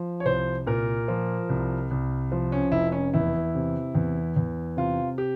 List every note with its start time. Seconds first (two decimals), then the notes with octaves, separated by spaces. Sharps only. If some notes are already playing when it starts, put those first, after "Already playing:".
Already playing: F3
0.20 C#5
0.25 C2 C5
0.67 A#2 A#4
1.08 F3
1.49 C2
1.91 C2
2.32 F3
2.52 C#4
2.72 F1 E4
2.92 C#4
3.13 E2 E4
3.55 C3
3.95 E2
4.36 E2
4.77 C3 F4
5.18 G4